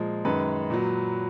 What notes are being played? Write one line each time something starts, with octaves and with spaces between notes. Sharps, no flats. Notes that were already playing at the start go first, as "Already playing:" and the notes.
Already playing: A#2 F3 G#3
F#2 D#3 G#3 B4
A#2 F#3